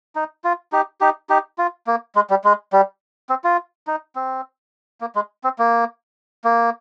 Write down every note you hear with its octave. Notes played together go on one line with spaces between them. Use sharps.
D#4
F4
D#4 G4
D#4 G4
D#4 G4
F4
A#3
G#3
G3
G#3
G3
C4
F4
D#4
C4
A#3
G#3
C4
A#3
A#3